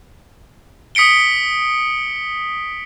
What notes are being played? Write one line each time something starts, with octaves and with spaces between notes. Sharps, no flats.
D#6 B6 C#7 D7 G7